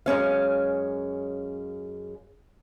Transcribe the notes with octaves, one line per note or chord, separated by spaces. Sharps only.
F#2 G#3 C#4 F5